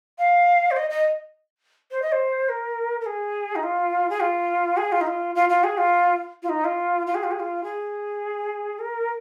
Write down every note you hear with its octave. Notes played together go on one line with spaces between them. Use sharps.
F5
C5
D#5
D#5
C5
D#5
C5
A#4
A#4
G#4
D#4
F4
G#4
F4
G#4
F4
D#4
F4
F4
F4
G#4
F4
F4
D#4
F4
F4
G#4
F4
G#4
F4
G#4
A#4